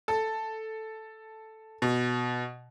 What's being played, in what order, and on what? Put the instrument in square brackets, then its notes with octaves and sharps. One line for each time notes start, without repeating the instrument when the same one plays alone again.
[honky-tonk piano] A4
B2